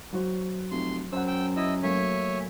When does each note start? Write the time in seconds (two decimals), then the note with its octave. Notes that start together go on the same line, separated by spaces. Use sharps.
0.13 F#3 F#4 C5
0.71 F1 C6
1.12 F#2 C5 F#5 E6
1.28 G5 E6
1.56 E4 D#5 E6
1.83 F#3 A3 A#3 C#5 E5 G#5